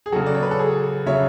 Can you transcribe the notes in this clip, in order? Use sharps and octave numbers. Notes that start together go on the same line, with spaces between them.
G#4
C#3 F#3 F#4 A4
D5
C#5
B4
A4
G#4
C#3 F#3 C#5 E5